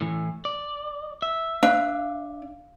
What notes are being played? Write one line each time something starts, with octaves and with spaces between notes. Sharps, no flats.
A2 E3
D5
E5
D4 F5